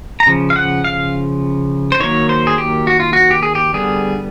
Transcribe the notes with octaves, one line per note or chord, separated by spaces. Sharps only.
A#5
C#3 F3
F5
F#5
F5
C5
D#3 F#3 A#3 C#5
C5
G#4
G4
F#4
F4
F#4
G4
G#4
G4
D3 G3 B3 G#4